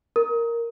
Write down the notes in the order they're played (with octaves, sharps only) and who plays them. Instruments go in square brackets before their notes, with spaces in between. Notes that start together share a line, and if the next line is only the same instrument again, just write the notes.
[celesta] A#4